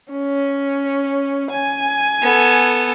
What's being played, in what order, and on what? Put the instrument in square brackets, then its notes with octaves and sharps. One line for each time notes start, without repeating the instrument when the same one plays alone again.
[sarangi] C#4
G#5
[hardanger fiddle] B3 A4